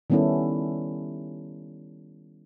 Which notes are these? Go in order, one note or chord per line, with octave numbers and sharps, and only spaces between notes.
D#3 G3 B3 C#4 E4 A4